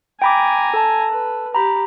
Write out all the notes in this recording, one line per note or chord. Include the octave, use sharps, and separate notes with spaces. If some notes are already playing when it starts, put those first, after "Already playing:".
G5 G#5 A#5 B5 D6
A4 A5
B4
G4 A#5 B5